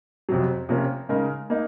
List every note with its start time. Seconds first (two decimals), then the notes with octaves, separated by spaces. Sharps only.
0.29 F2 C3 F#3
0.69 C3 F3 A#3 C#4
1.09 C#3 G#3 D#4 A#4
1.50 A#3 D#4